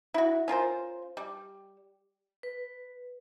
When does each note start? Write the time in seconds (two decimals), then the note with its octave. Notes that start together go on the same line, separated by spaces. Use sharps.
0.14 E4 F#4
0.48 C#4 F4 A#4 C5
1.17 G3
2.43 B4